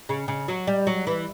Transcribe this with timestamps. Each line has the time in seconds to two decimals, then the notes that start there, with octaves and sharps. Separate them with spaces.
0.09 C#3
0.28 C#3
0.48 F#3
0.67 G3
0.87 F#3
1.07 E3